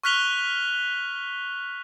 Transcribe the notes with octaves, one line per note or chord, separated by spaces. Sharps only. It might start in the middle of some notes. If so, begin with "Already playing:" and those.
C#6 F6 F#6 B6 F7 G7